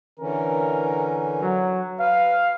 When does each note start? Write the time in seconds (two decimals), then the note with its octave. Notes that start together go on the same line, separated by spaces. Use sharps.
0.19 D3 E3 C#4 A#4
1.42 F#3
2.00 B4 F5